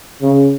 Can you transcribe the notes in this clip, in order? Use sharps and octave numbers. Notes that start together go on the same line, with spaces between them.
C#3